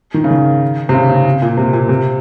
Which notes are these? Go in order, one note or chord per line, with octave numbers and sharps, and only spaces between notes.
D#3
C#3
D#3
C3
C#3
C#3
A#2
C3
A#2
C3